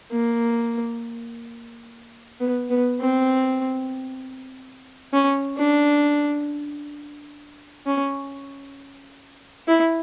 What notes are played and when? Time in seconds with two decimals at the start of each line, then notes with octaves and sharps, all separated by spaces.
0.11 A#3
2.40 B3
2.70 B3
3.00 C4
5.13 C#4
5.58 D4
7.86 C#4
9.67 E4